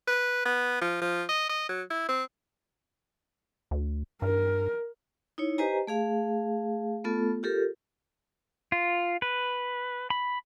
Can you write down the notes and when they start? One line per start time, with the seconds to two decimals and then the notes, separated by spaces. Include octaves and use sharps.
0.07 B4
0.45 B3
0.82 F3
1.02 F3
1.29 D#5
1.49 D#5
1.69 F#3
1.91 E4
2.09 C4
3.71 D2
4.22 G2 A#4
5.38 D#4 E4 C#5
5.58 G4 B4 C5 D#5 G#5 A#5
5.87 A3 G#4 F5
7.04 A3 B3 F4 A4
7.43 F4 G4 A4 A#4
8.72 F4
9.22 B4
10.10 B5